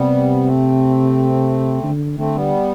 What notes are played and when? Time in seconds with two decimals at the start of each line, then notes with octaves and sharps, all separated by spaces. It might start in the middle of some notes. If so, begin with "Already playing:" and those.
Already playing: C3 G3 B3
0.45 A3 C4
1.84 D3
2.18 D3 A3 C4
2.35 G3 B3